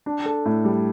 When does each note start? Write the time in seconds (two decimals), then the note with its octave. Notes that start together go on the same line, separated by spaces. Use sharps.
0.06 D4
0.25 A4
0.45 A2
0.65 G3